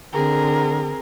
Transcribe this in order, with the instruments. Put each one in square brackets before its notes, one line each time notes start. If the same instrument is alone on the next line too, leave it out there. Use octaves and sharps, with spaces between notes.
[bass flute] D3 [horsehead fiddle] C4 G#4 [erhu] A#4